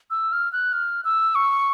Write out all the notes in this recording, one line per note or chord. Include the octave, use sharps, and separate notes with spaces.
E6
F6
F#6
F6
E6
C#6